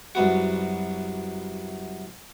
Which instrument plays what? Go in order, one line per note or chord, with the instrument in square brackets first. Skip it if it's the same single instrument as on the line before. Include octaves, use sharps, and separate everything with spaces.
[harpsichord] C2 F#2 B3 F#4